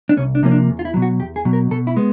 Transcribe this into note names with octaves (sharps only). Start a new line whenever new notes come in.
D4
C2 C#4
D4
C3 F3 A#3 C#4
D4
E2
F4
E4
B2 F#3
F#4
E2 G4
G#4
B2 F#3
A#4
B2 A4
E4
G#3 B3